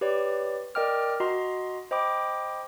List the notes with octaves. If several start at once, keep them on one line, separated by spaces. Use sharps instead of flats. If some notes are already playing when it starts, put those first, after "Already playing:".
G4 B4 C#5 D5
A#4 D5 D#5 G5 D6 F6
F#4 D#5 A#5 C6
C5 D#5 G5 B5 D6